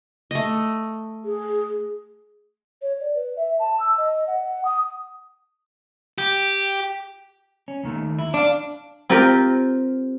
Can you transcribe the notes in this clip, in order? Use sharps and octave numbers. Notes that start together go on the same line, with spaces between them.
A3 D#5
G#4
C#5
D5
B4
E5
A5
E6
D#5
F#5
D#6
G4
C#4
D#2 D#3 A3
E4
D4 C#5 F5
C4 F4 G4 A#4 G5